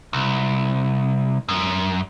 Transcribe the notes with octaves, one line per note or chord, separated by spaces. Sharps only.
C2
F#2